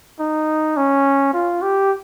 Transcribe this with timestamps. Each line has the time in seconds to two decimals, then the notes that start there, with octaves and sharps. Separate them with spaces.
0.20 D#4
0.77 C#4
1.33 F4
1.62 G4